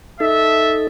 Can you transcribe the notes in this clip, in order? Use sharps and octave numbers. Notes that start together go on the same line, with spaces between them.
D#4 A4 E5